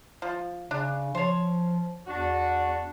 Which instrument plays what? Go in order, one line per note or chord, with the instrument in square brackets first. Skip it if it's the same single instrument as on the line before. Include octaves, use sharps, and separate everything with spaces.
[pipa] F3
[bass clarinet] C#3 [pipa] D4
[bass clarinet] F3 [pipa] C5 C#5
[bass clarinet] E2 [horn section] D4 F#4